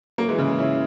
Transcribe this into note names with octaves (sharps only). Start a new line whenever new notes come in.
F#3 A#3
E3 G#3
C#3 E3
C#4 E4